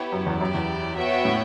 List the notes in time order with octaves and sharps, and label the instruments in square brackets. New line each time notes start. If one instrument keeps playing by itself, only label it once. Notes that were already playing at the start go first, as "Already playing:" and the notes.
Already playing: [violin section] B3 E4 G4 C#5
[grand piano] F#2
E2
[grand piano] F#2 [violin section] E4 G4 D5
[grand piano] E2
[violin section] B3 F#4 C#5 E5 G5
[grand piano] A2